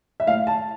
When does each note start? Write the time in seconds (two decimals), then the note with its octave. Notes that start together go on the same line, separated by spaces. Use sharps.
0.20 E5
0.27 A2 F5
0.47 A5